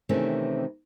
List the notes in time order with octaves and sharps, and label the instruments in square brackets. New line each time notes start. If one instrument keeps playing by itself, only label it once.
[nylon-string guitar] C3 D#3 E3 A3 C4 C#4